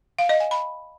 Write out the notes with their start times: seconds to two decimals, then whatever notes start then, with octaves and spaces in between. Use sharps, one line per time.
0.19 F5
0.29 D#5
0.40 G#5
0.51 B5